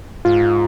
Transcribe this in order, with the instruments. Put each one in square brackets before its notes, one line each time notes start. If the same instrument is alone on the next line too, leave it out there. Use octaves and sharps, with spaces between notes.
[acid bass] G#2 [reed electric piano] F4